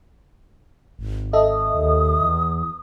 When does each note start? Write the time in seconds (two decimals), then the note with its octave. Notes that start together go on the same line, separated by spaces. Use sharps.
0.99 G#1
1.33 A4 D#5 E5 D#6
1.74 D#2
2.20 E2